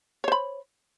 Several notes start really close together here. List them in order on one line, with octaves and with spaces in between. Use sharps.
C#5 C5 B5